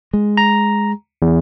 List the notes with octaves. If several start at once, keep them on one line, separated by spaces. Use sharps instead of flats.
G#3
A#5
E2